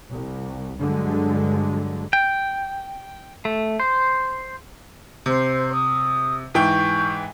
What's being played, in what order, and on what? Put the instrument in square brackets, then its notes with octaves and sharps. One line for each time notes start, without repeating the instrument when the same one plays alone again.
[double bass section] C2
G2 D3 F#3 G#3
[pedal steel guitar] G5
A3
C5
[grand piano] C3 [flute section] C5
[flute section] D#6
[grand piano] G#2 E3 G5 [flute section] C#6 G6